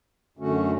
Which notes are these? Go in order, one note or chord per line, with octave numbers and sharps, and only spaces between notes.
F#2 D3 A3 C#4 F#4